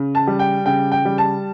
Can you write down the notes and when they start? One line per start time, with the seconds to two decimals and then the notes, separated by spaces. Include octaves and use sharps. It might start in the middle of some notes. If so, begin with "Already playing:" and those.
Already playing: C#3
0.15 A5
0.27 G3
0.39 G5
0.66 C#3 G5
0.92 G5
1.05 G3
1.18 A5